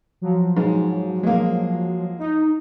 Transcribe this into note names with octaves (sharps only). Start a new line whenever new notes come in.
F3 F#3
G#2
G#3 A#3
D#4